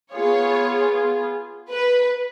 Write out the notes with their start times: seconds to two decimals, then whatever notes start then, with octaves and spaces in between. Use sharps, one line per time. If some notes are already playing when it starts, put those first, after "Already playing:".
0.12 B3 F4 G#4 C#5
1.70 B4